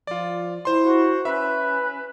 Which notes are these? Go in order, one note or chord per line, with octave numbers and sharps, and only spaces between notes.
F3 F4 D5
E4 C5 C6
F#4
C#4 B4 E5